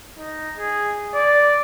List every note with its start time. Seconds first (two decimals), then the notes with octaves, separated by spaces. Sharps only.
0.18 D#4
0.57 G#4
1.15 D5